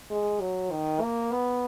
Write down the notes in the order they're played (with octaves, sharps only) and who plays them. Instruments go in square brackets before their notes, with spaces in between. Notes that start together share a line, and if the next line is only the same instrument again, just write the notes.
[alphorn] G#3
F#3
D#3
A#3
B3